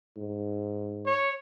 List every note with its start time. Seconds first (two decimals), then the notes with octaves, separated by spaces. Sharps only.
0.17 G#2
1.06 C#5